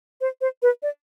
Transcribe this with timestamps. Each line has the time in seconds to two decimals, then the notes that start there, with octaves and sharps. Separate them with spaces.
0.21 C5
0.41 C5
0.62 B4
0.83 D5